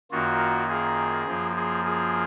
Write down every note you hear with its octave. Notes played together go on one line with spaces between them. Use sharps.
F#2 D#3 A#3 F4 F#4
F4 G#4
F#2 F3 A#3 F4
F4 G#4
F4 G#4